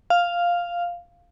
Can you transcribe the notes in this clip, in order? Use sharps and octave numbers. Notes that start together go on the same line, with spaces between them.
F5